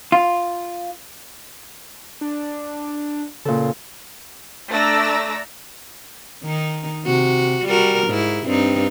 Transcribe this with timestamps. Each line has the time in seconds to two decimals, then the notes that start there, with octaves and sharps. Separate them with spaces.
0.12 F4
2.21 D4
3.45 A#2 C#3 A4
4.71 A3 D4 D5 A#5 E6 A#6
6.44 D#3 D#4
7.05 C3 F#4
7.66 G3 F#4 A#4
8.07 G#2 E4
8.47 G2 C4 D#4